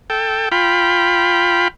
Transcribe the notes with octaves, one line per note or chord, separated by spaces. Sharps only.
A4 G5
F4 G5 B5